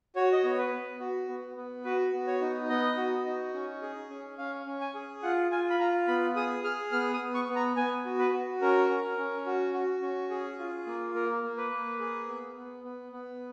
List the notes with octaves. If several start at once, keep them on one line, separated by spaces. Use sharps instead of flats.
F#4 C#5
D#5
B3 C#5
B4
B3
F#4
B3
B3
F#4 B4
B3
C#5
D#4
B3 D#5
F#4
D#4
C#4
G#4
C#4
C#4 F5
C#4
G#5
G#4
F4 F#5
F4 G#5
B5
F4 A#5
B3 B5
G#4 D#6
G#4 F6
B3 F6
D#6
B3
C#6
B3
A#5
B3 G#5
F#4
B4
F#4
C#4 A#4
C#4
C#4
F#4
F#4
C#4
G#4
F4
A#3
A#3 A#4
A#3
B4
A#3
G#4
B3
B3
B3
B3